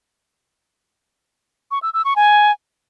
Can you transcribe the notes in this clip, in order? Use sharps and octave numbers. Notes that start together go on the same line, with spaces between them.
C#6
E6
E6
C#6
G#5